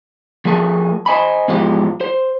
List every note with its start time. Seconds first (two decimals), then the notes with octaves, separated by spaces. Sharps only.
0.45 F3 A3 G#4 A#4 A5
1.06 C5 D#5 G#5 B5
1.48 E2 G#2 F3 G#3 G4 F5
2.01 C5